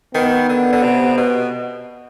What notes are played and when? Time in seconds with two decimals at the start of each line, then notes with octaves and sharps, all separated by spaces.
0.15 D#3 B3
0.49 D3
0.73 D3
0.83 C3
1.17 B2